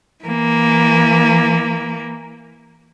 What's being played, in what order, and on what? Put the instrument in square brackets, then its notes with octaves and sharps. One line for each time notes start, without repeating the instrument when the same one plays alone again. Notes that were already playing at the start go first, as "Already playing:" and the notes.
[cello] E3 A#3